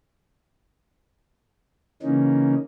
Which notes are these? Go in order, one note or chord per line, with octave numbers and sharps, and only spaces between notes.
C#3 E3 A#3 C#4 D#4